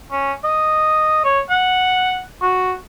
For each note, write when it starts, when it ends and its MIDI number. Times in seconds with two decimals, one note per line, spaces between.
0.12 0.33 61
0.44 1.23 75
1.25 1.40 73
1.50 2.21 78
2.43 2.73 66